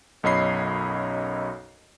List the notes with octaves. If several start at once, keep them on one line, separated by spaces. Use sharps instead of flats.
B1 F#2 C#5 D#5 B5 C7